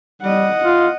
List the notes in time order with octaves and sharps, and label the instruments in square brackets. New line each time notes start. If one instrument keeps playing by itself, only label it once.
[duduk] G3 [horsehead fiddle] D#5 F#5
[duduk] F4